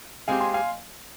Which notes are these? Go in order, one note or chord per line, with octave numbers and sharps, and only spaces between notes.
G#3 C4 G4 F5 G#5
G#5 C6
F5 G#5